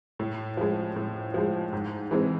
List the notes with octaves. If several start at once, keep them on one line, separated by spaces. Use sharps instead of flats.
A2
F3 G#3
A2
F3 G#3
G#2
E3 G#3 C4